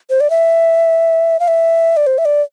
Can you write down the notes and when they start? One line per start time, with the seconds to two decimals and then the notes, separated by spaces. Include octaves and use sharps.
0.10 C5
0.21 D5
0.30 E5
1.40 F5
1.48 E5
1.97 D5
2.07 C5
2.18 E5
2.25 D5